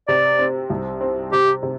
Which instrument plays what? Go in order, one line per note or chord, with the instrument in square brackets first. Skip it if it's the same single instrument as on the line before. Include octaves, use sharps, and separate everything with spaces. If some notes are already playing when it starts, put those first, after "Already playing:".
[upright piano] C3 [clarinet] D5
[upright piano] C4
C2
C4
[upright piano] C3 [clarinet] G4
[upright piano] C3